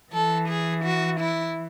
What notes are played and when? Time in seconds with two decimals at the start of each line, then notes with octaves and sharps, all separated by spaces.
0.13 E3 A4
0.48 G#4
0.84 F#4
1.20 E4